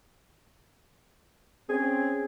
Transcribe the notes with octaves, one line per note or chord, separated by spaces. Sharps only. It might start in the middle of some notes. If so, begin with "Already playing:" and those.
C4 C#4 G#4